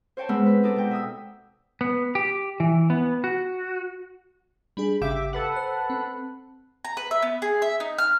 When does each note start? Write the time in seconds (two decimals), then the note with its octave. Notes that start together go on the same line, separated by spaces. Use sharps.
0.17 C5 C#5 G5 A5
0.29 G#3 B3 C4 B5 E6
0.46 B4
0.63 G#3 D#4 A4 D5
0.76 B2 G5
0.91 E5 D#6 E6
1.81 B3
2.15 G4
2.60 E3
2.90 B3
3.24 F#4
4.77 G3 D4 G#4 B5
5.01 G#1 C#3 G4 E5 F5 D6
5.33 A4 B4 F#5
5.56 C5
5.90 C4
6.85 A#5
6.97 B4
7.11 E5
7.23 B3
7.42 G#4
7.62 E5
7.80 D#4
7.98 F6